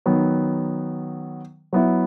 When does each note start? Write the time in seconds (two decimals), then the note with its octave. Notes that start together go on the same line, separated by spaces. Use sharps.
0.06 D#3 F#3 B3
1.73 F#3 B3 E4